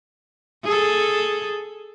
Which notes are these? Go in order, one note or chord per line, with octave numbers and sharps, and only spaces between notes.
G#4 A4